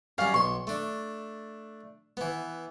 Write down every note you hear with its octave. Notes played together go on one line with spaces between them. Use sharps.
F#2 G3 C#4 F5
B1 C6 C#6
A3 D4
E3 B3